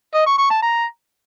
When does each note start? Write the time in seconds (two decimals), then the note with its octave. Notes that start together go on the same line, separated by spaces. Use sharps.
0.15 D#5
0.26 C#6
0.38 C#6
0.50 A5
0.62 A#5